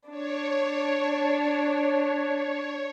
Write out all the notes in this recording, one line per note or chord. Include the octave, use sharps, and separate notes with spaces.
D4 C#5